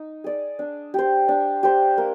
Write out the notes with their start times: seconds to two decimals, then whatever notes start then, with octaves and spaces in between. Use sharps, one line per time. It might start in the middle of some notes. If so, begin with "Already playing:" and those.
Already playing: D#4
0.24 G#4 D5
0.59 D4
0.94 G4 C5
1.28 D4
1.63 G4 C5
1.98 A#3